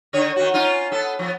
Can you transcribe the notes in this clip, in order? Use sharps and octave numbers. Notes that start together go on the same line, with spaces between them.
D3 D#3 C#5
D#3 F#4
C#4 D#4 F4
B3 A4
F3 B3